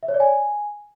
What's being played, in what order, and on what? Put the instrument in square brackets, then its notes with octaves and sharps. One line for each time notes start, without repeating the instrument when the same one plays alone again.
[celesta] E5
C#5
D5
G#5